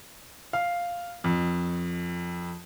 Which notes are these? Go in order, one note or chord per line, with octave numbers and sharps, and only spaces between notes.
F5
F2